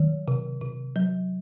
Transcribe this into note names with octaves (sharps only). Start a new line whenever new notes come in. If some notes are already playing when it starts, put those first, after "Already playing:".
Already playing: D#3 F#3
C3
C3
F#3